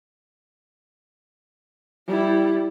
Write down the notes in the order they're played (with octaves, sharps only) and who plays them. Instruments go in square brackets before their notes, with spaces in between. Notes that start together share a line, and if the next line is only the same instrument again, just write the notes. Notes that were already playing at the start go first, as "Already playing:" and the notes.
[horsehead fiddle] G3 E4